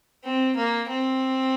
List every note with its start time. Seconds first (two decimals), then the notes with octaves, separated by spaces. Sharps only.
0.24 C4
0.56 A#3
0.89 C4